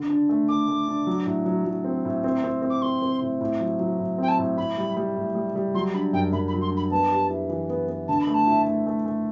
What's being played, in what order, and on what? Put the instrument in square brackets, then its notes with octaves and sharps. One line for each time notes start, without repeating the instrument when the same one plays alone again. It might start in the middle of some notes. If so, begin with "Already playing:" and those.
Already playing: [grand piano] D3
D4
A3
[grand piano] A3 [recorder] D6
[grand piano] A3
D4
F#3
A2
F#3
F#3
C4
A2
C4
C4
C4
[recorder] D6
[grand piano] C4 [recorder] C6
[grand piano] C4
A2
A2
F#3
F#3
A2
[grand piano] C4 [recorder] G5
[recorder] A5
[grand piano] A2
[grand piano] A2 [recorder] B5
[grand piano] G3
G3
A2
G3
G3
[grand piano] F#3 [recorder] C6
[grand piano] D4 [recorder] B5
[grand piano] F#2 [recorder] G5
[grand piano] F#2 [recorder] B5
[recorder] B5
[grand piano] F#3
[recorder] C6
[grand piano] D4
[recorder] B5
[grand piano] B3 [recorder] A5
[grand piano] G4
E4
E3
B3
B3
[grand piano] D3 [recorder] A5
[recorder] B5
[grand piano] A3
[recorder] A5
[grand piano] E4
A3
A3
A3